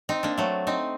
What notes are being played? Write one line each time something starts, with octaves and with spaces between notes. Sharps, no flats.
C4 D#4
A#3 D4
F#3 A3
C4 D#4